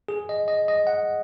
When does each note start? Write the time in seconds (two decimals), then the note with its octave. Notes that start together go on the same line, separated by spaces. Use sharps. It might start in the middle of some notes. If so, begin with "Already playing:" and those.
0.08 G#4
0.29 D#5
0.48 D#5
0.68 D#5
0.87 F#5